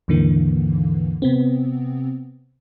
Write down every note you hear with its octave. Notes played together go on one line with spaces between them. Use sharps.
D#2 G#2 D3 E3 A#3
C3 B3 C4